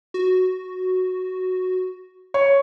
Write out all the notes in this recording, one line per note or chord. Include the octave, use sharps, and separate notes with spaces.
F#4
C#5